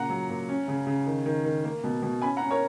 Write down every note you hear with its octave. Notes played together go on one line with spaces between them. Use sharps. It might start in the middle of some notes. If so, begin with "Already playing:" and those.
Already playing: A#2 C#3 F#5 A#5
F#3
A#2
C#4
C#3
C#3
D#3
D#3
D#3
A#3
B2
B2
C#4 G#5 B5
F#5 A#5
C#4
A#4 C#5